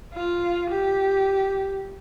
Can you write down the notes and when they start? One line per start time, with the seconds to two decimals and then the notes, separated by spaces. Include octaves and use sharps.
0.14 F4
0.70 G4